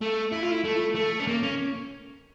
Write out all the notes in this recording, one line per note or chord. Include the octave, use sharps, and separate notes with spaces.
A3
E4
F4
E4
A3
A3
C#4
A#3
C#4